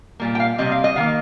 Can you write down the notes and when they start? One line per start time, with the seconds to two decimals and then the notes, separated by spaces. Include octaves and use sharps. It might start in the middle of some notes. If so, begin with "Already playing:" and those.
0.20 A#2 G3 A#3
0.35 G5
0.40 F5
0.58 C3 G3 C4 D#5
0.71 F5
0.84 D#5
0.96 D#3 A#3 F5